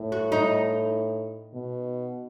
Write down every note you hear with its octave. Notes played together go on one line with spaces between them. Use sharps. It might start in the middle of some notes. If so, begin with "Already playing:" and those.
Already playing: A2
F#4
D#4
B2